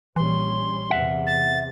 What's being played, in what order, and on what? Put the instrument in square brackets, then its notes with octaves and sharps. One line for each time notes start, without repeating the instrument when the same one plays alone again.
[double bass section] A#1 G3 C#4 [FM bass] E3 [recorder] C6
[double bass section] E2 C3 [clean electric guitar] E5 F#5
[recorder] A6